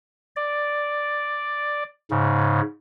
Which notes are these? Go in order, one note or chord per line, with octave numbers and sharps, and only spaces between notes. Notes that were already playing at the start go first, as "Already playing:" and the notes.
D5
G#2 C#3